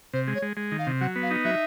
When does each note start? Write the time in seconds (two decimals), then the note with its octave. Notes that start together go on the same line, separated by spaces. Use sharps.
0.13 C3 C5
0.28 G#3
0.35 C#5
0.42 G#3
0.57 G#3
0.72 D#3
0.79 F5
0.87 C3
1.01 F#3 F#5
1.16 B3
1.23 F5
1.31 D#4
1.45 F#3 E5